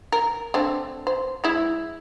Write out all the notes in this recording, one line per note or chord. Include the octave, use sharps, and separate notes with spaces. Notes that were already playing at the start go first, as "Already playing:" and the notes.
A#4
D3 A3 C4
C5
G#3 E4